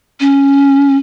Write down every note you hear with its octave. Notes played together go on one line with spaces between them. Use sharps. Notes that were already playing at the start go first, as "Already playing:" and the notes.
C#4